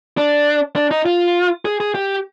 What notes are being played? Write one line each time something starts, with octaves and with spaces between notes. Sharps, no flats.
D4
D4
D#4
F4
G#4
G#4
G4